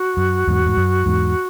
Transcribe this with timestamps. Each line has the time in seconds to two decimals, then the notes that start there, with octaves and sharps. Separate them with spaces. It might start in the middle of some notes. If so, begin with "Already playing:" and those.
Already playing: F#4
0.17 F#2
0.47 E2 G#2
0.66 G#2
0.77 F#2
1.06 E2 G#2